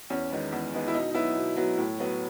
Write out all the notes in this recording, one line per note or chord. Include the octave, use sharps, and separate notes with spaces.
E2 C#4
D#3 G#3 B3
E2
D#3 G#3 B3
E4
B2 D#4
D#4
F#3 B3 E4
B2
F#3 B3
A2
F#3 B3